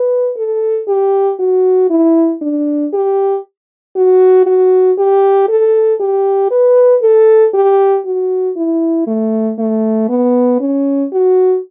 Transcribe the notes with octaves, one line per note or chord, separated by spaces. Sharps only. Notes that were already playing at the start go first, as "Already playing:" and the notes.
Already playing: B4
A4
G4
F#4
E4
D4
G4
F#4
F#4
G4
A4
G4
B4
A4
G4
F#4
E4
A3
A3
B3
C#4
F#4